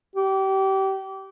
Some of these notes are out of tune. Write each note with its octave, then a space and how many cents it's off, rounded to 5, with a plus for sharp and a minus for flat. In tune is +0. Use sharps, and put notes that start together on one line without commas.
G4 -25